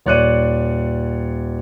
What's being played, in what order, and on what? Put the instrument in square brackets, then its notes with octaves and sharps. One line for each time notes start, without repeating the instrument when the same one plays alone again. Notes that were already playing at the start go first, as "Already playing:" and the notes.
[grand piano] D#1 C#5 D5 F#6 C#7 D#7